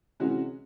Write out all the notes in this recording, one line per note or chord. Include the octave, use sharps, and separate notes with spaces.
C3 E3 G#3 C#4 F#4